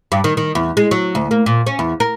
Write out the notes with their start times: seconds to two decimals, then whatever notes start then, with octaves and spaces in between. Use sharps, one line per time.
0.12 G2
0.24 D#3
0.37 D#3
0.55 E2
0.77 G#3
0.91 F#3
1.15 D2
1.31 A#3
1.46 A#2
1.67 C#4
1.79 E2
2.00 A#4